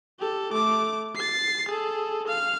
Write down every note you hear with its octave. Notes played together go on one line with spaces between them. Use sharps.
G4 A4
A3 D6
A6 C7
G#4 A4
F5 F6